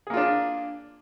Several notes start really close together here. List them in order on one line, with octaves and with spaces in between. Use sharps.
G#4 A#3 F4 D4